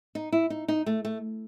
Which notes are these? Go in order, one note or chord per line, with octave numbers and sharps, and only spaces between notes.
D#4
E4
D#4
D#4
A3
A3